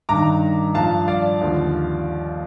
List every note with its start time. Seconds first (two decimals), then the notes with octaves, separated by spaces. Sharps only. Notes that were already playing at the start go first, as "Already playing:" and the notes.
0.09 G2 D#3 A#5 D6
0.75 G2 F3 F5 A5
1.08 D5 F5
1.41 D#2 D3 F3